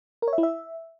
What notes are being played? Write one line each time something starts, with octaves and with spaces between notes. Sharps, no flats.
A#4
C#5
E5
E4
E5